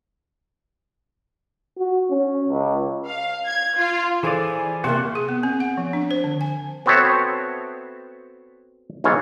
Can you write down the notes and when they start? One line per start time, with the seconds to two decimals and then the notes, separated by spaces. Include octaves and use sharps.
1.78 F#4
2.10 C#4
2.48 C#2
3.08 F5
3.47 G#6
3.79 F4
4.23 E3 G#4 A4 C5 D5 G#5
4.84 C3 A3 A#3 F#4 C6
5.15 G#4
5.29 B3
5.43 C4
5.60 F#5
5.77 F3
5.93 D4
6.11 C5
6.24 D3
6.41 G#5
6.86 B3 C4 F#4 A4 C#5 E5
9.04 B1 G#2 E3 F4 C#5